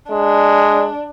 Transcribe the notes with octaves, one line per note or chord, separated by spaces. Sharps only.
G#3 D4